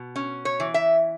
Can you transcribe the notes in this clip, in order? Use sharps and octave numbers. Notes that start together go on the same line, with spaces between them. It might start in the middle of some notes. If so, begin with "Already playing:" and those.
Already playing: B2
C#4
C#5
E3
E5